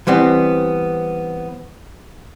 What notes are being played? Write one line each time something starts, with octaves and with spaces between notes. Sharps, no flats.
E3 G3 B3 C4